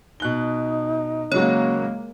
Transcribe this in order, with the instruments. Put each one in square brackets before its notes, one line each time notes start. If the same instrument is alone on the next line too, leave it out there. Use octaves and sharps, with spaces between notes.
[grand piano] B2 F#6 G7 [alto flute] D#4
[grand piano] C#3 F#3 F#4 [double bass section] G#3 A#3 [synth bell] C#5